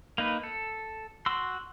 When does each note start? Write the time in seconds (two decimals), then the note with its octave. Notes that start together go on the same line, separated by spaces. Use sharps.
0.18 A#3 D#4 B4
0.43 A4
1.26 F#4 C6 E6